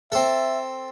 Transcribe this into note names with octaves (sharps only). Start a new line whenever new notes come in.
C4 A4 E5